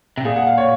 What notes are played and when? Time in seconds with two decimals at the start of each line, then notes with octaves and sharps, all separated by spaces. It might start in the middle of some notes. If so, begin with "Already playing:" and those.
0.17 C3
0.25 A#2 G#4
0.36 F#5
0.47 F5
0.58 C#5